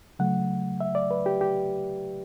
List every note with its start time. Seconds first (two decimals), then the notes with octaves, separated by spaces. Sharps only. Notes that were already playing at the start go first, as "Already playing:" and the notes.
0.19 C#3 F#3 A3 F#5
0.81 E5
0.95 D5
1.11 B4
1.26 G4
1.41 G4